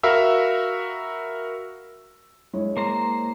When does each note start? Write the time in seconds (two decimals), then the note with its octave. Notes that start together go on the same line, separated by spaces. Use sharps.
0.03 F#4 A#4 E5 F5 B5 E6
2.53 G#3 E4 C#5
2.77 A#3 C5 A#5